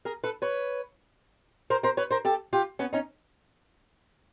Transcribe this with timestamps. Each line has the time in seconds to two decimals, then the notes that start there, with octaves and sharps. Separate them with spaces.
0.05 G#4 A#4
0.24 A4 B4
0.42 B4 C#5
1.70 A#4 C5
1.83 A#4 C5
1.97 B4 C#5
2.11 A#4 C5
2.25 G4 A4
2.53 F4 G4
2.79 B3 C#4
2.93 C#4 D#4